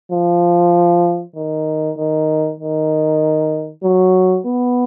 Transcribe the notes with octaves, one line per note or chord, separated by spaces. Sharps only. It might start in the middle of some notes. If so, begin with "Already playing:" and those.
F3
D#3
D#3
D#3
F#3
B3